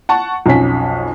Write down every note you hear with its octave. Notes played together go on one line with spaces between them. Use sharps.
F#5 A5 C#6
B1 F2 C#4 B6